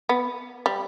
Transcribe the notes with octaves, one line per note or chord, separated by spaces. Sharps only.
B3
G3